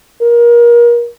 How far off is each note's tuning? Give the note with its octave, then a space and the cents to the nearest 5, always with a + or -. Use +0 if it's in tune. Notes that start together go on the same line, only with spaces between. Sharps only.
A#4 +30